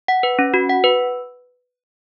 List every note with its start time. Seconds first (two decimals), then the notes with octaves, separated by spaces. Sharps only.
0.08 F#5
0.23 B4
0.39 C#4
0.54 F#4
0.69 F#5
0.84 B4